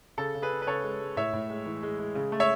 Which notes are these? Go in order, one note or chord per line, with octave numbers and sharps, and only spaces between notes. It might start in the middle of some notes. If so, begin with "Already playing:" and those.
C#3 A4
C#3
G#4 B4
C#3
B4
C#3 A4 C#5
G#3
G#3
A2 C#5 E5
A2
G#3
E3
G#3
G#3
C#3
A3
C#5 E5